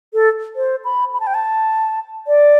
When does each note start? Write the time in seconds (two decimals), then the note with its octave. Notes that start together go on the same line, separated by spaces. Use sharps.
0.14 A4
0.56 C5
0.85 B5
1.14 B5
1.20 A5
1.27 G5
1.34 A5
2.27 D5